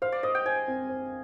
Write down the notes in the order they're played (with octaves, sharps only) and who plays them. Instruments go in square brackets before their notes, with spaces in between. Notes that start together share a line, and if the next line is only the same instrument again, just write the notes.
[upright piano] C5 [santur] F5
[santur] D5
[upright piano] C5 [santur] D#5
[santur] G5
[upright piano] C5 [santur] G#5
[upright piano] C4
C5